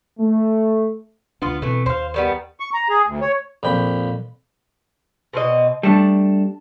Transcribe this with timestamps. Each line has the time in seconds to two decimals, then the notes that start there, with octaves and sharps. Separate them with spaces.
0.19 A3
1.42 D2 B3 D4 F4
1.62 B2 E3 A3 C4
1.86 D#2 C5 F5
2.14 D#3 G3 B3
2.60 C#6
2.74 A#5
2.90 G#4
3.06 D2
3.21 C#5
3.63 A#1 F2 G5 B5
5.33 B2 C4 D#5
5.83 G3 A3 D4 A5